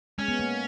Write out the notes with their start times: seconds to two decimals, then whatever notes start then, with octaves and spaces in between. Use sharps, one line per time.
0.18 G#3 C#4
0.28 B3
0.39 A#3